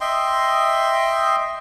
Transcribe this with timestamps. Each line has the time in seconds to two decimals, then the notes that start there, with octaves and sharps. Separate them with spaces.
0.01 D#5 E5 G5 C6